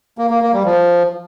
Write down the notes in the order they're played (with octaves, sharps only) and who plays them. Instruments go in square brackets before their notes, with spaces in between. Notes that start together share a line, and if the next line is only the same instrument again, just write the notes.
[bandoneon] A#3
A#3
A#3
G3
F3